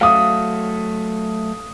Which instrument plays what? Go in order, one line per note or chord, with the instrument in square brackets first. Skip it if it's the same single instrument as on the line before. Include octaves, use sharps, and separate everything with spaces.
[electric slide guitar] F#3 A3 [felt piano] F5 D#6